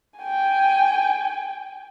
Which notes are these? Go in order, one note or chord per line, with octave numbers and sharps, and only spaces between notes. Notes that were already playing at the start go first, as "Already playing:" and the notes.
G5 G#5